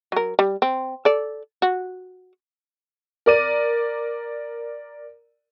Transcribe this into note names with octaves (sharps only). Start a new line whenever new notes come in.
F#3 A#4
G3
C4
A4 D5
F#4
A#4 D5 D#7